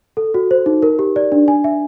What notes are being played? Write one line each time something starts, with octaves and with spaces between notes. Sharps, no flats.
A4
F#4
C5
D#4
A#4
G4
D5
D4
G#5
E5